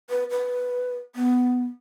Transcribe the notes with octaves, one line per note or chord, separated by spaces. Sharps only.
B4
B4
B3